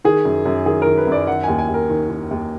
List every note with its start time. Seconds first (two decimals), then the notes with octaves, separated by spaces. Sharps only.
0.04 D#3 G#4
0.25 F#2
0.46 F#2
0.66 D#3 G#4
0.82 D#3 A#4
0.97 B4
1.07 F#2 D5
1.27 D#3 F#5
1.43 D#2 G#5
1.59 G#5
1.69 D#2
1.74 A#4
1.90 D#3
2.09 D#3
2.31 D#2